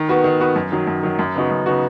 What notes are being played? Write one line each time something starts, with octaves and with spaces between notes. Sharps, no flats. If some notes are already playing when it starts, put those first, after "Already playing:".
Already playing: D#3
B3 F#4 B4
D#3
B3 F#4 B4
F#2
D#3 F#3
F#2
D#3 F#3
F#2
C#3 B3 D#4 F#4
F#2
C#3 B3 D#4 F#4